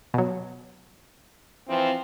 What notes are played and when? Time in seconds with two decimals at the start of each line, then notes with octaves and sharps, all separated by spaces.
0.14 B2 F#3
1.68 E3 F3 C4